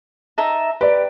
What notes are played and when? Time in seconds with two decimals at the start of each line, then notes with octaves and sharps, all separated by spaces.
0.38 D#4 E5 A5
0.81 G4 B4 D5